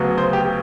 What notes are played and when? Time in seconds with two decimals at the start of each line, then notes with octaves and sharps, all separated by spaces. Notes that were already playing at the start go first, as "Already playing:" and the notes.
Already playing: D2 C#3 F#3 B3
0.18 C5
0.33 G4